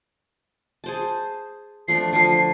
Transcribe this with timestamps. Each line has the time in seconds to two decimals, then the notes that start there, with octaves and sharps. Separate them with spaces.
0.84 G#4 C5 A5
1.88 F3 A3 D4 C7
2.13 D3 F3